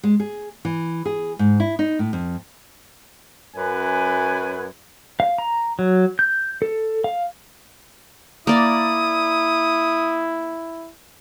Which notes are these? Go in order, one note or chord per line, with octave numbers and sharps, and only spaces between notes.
G#3
G#4
E3
G#4
G#2
E4
D#4
A2
F2
F#2 B4 G#5
F5
A#5
F#3
G6
A4
F5
A#3 E4 D5 D#6